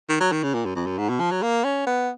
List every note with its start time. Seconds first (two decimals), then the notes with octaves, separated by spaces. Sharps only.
0.09 D#3
0.20 F#3
0.32 D#3
0.43 C#3
0.54 A#2
0.66 F#2
0.76 F2
0.87 F#2
0.98 G#2
1.09 B2
1.20 F3
1.31 F#3
1.43 A#3
1.64 C#4
1.87 B3